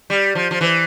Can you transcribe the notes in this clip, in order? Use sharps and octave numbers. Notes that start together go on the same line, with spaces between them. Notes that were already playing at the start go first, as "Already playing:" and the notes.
G3
F3
F3
E3